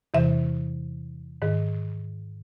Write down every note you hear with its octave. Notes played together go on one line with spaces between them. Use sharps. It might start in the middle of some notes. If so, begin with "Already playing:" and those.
E2 C3 E3 E5
G#2 D#3